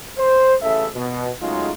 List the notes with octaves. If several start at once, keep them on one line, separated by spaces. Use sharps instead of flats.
C5
A1 C#3 A4 E5
B2
A2 C#3 F#3 G#3 D#4 F4